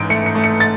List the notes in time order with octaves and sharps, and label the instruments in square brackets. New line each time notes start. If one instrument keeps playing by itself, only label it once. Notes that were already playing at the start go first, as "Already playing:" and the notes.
Already playing: [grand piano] A1 G#2 [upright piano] D7
[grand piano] A3 [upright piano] C#7
[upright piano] C#7
[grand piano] A3
[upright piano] C#7
A6